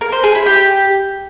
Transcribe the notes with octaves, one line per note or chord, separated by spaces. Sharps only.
A#4
C5
G#4
E4
G4